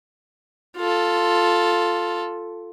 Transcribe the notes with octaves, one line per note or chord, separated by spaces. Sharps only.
F4 A4